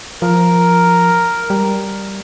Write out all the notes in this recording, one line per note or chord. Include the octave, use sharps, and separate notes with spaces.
F3 A#4
G3